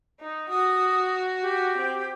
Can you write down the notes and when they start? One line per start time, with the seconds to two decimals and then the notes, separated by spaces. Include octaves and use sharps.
0.20 D#4
0.49 F#4 D#6
1.42 G4
1.77 C4